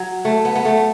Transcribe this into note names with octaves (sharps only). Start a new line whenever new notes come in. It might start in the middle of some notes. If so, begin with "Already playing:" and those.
Already playing: F#3
A3
B3
B3
A3